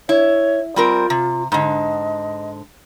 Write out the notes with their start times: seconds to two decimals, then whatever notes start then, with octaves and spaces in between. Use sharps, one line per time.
0.09 E4 C#5
0.76 G3 C4 F4 A#4
1.10 C3
1.52 G#2 D3 D#5